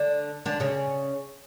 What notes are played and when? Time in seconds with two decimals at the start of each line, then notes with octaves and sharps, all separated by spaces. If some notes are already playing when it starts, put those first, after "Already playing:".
Already playing: D3 D4
0.46 D3 D4
0.60 C#3 C#4